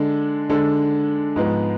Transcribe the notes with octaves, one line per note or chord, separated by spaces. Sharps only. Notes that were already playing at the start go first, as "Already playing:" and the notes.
Already playing: D3 G#3 D4 A4
D3 G#3 D4 A4
G#2 F3 G#3 B3